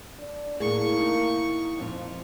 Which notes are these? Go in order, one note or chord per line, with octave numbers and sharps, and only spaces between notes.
D4
E2 A2 A#3 G#4 C#6
D#3 D#4
F2 A#2 F3 F4